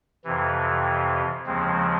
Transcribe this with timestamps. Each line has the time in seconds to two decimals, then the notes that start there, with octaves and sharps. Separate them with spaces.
0.25 F2 C3 E3
1.46 D#2 C#3 F3 G#3 C4